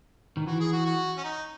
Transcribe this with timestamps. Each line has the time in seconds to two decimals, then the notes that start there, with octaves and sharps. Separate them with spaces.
0.37 D#3
0.47 E3 F#4
0.60 G#4
0.73 F#4
0.85 F#4
1.18 C#4
1.24 D#4